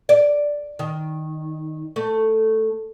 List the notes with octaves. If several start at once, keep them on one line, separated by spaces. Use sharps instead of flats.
D5
D#3
A3